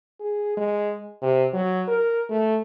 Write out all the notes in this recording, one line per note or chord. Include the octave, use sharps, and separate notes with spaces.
G#4
G#3
C3
F#3
A#4
A3